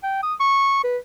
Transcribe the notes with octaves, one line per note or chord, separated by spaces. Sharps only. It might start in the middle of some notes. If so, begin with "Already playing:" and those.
G5
D#6
C#6
B4